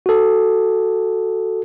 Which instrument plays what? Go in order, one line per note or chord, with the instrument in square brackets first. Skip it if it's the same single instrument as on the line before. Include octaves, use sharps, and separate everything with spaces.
[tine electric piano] F#4 A4